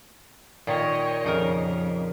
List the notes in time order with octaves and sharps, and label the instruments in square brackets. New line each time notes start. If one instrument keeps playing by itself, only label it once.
[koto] A#2 D#3 [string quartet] C#5 D#5 G5
[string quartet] F2 [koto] C#3 D#4 A#4